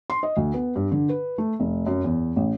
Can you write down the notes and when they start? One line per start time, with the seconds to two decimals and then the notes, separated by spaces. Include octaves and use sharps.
0.10 C6
0.23 D#5
0.37 D2
0.54 B3
0.76 G2
0.92 D3
1.09 B4
1.38 A3
1.60 F1
1.87 F#2
2.04 E2
2.36 A1